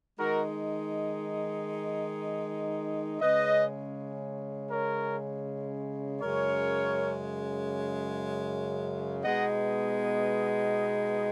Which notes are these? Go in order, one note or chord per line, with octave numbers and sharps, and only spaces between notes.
D#3 G#3 D#4 F#4 A#4
C#3 G#3 C#4 B4 D#5
A#4 C#5
F#2 C#3 G#3 A#4 C#5
B2 G#3 B3 D#4 D#5 F#5